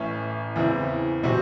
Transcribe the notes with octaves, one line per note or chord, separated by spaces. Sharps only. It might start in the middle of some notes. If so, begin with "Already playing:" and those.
Already playing: A1 A2 E3 A3 C#4
E2 C#3 E3 C4 E4
C3 E3 C4 F#4